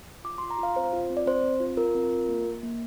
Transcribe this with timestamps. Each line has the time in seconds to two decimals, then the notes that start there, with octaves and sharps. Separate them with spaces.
0.24 F4 D6
0.38 C6
0.42 F4
0.50 A#5
0.58 F4 F5
0.76 C4 C5
0.93 F4
1.10 C4
1.17 D5
1.26 C4 C5
1.44 C4
1.60 F4
1.77 F4 A#4
1.95 C4
2.11 F4
2.29 A#3
2.46 A#3
2.63 A#3